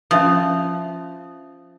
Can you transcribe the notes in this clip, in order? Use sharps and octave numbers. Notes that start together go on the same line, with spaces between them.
F3 C#4 E5 D#6